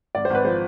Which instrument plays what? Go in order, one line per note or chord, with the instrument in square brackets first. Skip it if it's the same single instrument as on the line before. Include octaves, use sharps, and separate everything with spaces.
[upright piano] G#1 D5
C5
G#1 B4
F3 C5